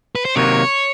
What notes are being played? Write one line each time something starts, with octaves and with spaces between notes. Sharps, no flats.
B4
C5
C3 D#3 F#3 A#3 C#5